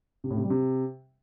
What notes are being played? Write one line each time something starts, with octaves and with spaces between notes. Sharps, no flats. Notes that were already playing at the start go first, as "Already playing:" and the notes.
C3
A2
C3
G3
C3